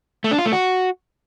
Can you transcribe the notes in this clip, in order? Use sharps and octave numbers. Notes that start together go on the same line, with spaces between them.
A3
D4
F4
A3
F#4